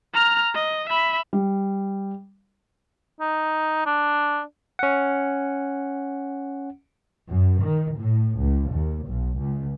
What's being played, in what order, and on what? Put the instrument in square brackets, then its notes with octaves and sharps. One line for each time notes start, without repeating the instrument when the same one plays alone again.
[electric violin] A#5 F6
D#5
E5 B5
[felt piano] G3
[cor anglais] D#4
D4
[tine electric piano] C#4 F#5
[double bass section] F#2
D#3
A2
C#2
D#2
B1
C#2